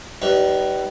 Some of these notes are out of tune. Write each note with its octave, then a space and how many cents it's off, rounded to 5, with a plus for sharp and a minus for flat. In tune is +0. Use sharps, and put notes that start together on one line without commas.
G3 -30 D#4 +0 B4 +0